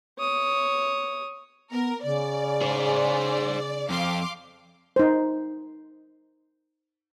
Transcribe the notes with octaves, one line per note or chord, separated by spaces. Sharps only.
C#5 D#6
B3 A#4
C#3 D5
G#4 C5
F2 F5 C6 D6
D#4 C5